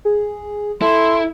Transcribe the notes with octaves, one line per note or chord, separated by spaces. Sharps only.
G#4
E4 A4 C6